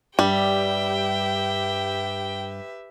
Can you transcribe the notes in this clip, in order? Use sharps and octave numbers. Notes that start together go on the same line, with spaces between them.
G2 G3 G4 B4 E5 G5